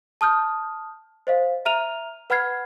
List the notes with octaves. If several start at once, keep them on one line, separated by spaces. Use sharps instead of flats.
A5 D#6 F6 G6
C5 D#5 F5
E5 A#5 F6 D#7 F7
B4 F#5 B5 F6 G#6 C7